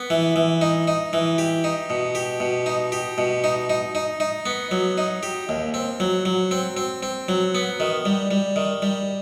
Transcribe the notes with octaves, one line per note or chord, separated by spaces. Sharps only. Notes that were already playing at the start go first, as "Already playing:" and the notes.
Already playing: B3
E3
E3
D#4
D#4
E3
G4
D#4
B2
G4
B2
D#4
G4
B2
D#4
D#4
D#4
D#4
B3
F#3
D#4
G4
D#2
C4
F#3
F#3
C4
C4
C4
F#3
B3
D#3
G3
G3
D#3
G3